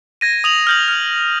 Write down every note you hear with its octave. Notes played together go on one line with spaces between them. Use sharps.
G#6 A#6 D#7
D#6 F7 F#7
F6 G6 F#7
F6